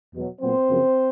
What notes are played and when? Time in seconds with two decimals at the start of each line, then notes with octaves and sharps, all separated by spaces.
0.12 E2 B2 F#3
0.41 A#2 F#3 B3 C4 C5
0.69 F#2 C#3 F3 A#3